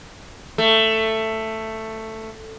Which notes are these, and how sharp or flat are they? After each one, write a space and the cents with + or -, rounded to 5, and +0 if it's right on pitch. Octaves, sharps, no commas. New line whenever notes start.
A3 +10